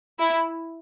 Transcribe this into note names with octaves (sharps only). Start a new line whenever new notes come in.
E4